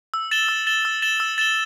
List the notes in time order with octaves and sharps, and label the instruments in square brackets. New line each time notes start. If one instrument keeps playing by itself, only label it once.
[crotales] E6
A6 E7 G7
E6
A6 E7 G7
E6
A6 E7 G7
E6
A6 E7 G7